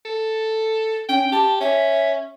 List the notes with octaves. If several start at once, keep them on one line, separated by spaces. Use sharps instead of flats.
A4
C#4 G5
G4 A5
C#4 E5